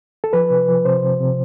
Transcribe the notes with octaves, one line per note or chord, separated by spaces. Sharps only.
A4
F3 B4
C3
F3
C3 C5
C3
C3